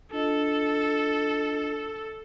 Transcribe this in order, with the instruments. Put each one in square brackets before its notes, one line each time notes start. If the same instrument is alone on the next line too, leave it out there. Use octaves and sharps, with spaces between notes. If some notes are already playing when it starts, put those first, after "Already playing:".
[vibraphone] D4 F4 D#5 [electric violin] A4